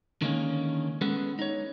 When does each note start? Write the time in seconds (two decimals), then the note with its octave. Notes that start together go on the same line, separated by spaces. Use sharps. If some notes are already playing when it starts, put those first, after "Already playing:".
0.22 D3 D#3 G#3 A#3 C4 C#4
1.01 G#3 B3 C#4 G#4 A4
1.39 D#4 C#5